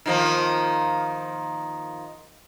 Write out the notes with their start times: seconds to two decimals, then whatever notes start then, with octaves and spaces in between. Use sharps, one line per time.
0.06 D#3 F3 A#3